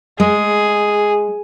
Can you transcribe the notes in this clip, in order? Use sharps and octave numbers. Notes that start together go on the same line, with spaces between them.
G#3 G#4